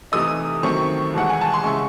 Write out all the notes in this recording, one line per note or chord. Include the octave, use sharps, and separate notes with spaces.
C3 E3 A3 D#4 D#6
F#2 D#3 A3 C4 C#6
C2 C3 E3 G#3 F#5
G#5
A5
C6
C#3 G#3 C#4 E4 C#6